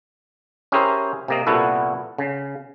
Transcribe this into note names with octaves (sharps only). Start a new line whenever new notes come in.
C#4 E4 G4 G#4 A#4 C5
C3 A#3 D#5
C2 A#2 B3 E4 F#4 A4
C#3